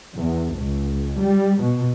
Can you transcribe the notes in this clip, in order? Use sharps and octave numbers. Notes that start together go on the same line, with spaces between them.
E2
C#2
G3
B2